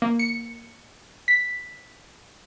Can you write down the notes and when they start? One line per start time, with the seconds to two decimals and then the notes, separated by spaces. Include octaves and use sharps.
0.02 A#3
0.19 C#7
1.28 B6